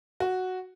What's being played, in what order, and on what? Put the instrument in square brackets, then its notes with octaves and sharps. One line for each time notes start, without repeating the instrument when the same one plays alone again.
[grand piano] F#4